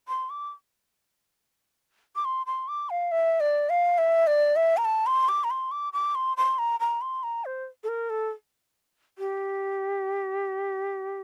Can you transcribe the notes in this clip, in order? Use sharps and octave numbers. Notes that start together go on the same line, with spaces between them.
C6
D6
D6
C6
C6
D6
F5
E5
D5
F5
E5
D5
E5
A#5
A5
C6
D6
A#5
C6
D6
D6
C6
C6
A#5
A#5
C6
A#5
C5
A4
A#4
A4
G4